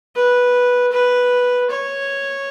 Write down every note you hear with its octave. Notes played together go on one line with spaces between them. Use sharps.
B4
B4
C#5